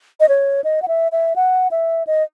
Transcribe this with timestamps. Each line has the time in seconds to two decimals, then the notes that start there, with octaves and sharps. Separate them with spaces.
0.20 D#5
0.29 C#5
0.64 D#5
0.82 F#5
0.88 E5
1.12 E5
1.36 F#5
1.71 E5
2.07 D#5